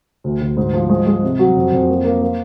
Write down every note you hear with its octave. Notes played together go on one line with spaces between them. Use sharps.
D2
D2
G#2
F3
G#3
G#3
C3
F#3
F2
F2
A#3
A#3
A#3